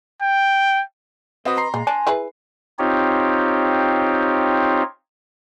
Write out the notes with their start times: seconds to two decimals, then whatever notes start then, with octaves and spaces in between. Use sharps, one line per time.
0.22 G5
1.45 C4 F#4 B4 D#5
1.57 A#5 C6 C7
1.74 A#2 G#3
1.87 D4 G#5
2.07 E4 G#4 B4
2.79 C4 D#4 F4 G4 C#5